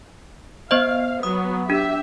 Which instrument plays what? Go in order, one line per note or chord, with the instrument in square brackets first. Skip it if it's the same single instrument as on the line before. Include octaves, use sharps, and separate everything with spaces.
[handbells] B3 C5 D#5 [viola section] F5
[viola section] F#3 B3 [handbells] D#6
[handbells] D4 [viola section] G4 E5